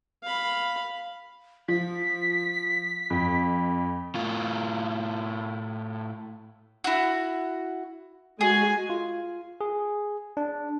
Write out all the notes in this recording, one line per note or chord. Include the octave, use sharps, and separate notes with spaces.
F5 B5
F3 B6
F2
A2 F4
E4 F#4
G#3 F#4 G#4 G#5
F4
G#4
D4